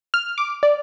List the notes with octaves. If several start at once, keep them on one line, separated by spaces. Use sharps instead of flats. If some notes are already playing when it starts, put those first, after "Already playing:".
F6
D6
D5